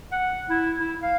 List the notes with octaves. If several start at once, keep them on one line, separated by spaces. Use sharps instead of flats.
F#5
E4
E4
F5